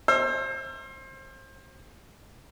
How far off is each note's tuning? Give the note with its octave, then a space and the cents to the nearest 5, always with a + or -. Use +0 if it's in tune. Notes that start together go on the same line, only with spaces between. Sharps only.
C5 +30 E6 +40